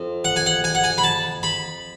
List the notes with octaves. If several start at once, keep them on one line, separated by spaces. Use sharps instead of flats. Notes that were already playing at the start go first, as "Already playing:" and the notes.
Already playing: F2
F#5
G#5
F#5
G#5
F#5
G#5
B5
A5
B5